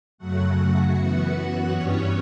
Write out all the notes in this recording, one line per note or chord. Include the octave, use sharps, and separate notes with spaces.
F#2 C#3 F#3 A3 F#4 F#5
F#2 E3 B3 F#4 F#5
G2 E3 G3 B3 C#4 C#5